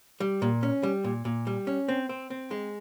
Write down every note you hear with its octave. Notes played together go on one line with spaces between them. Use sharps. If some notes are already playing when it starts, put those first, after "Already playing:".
G3
A#2
C#4
G3
A#2
A#2
G3
C#4
C4
C4
C4
G#3